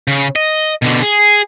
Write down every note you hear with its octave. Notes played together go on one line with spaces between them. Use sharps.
C#3
D#5
B2 D3
G#4